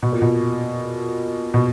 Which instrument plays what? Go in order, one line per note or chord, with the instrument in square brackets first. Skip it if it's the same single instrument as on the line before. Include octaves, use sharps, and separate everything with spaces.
[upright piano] B2
A#2
B2
B2